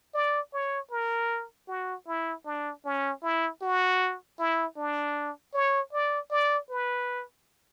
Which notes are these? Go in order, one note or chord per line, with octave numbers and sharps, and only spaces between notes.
D5
C#5
A#4
F#4
E4
D4
C#4
E4
F#4
E4
D4
C#5
D5
D5
B4